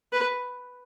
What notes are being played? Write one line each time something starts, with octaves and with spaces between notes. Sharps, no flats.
B4